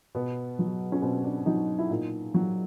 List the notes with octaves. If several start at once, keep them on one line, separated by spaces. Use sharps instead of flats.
B2 B3
F#3
C#4
B2 C4
D4
F#3 D#4
E4
A#2 D#4
F#3